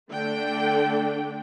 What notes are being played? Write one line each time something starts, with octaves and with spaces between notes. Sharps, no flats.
D3 A3 D4 G5